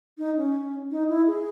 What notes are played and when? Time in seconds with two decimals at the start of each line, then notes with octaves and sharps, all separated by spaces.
0.18 D#4
0.37 C#4
0.91 D#4
1.09 E4
1.27 G#4